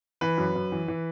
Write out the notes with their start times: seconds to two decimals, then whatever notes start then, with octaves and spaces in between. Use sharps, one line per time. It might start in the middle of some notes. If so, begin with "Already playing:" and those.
0.21 E3 B4
0.38 F#2
0.56 F#2
0.72 E3
0.88 E3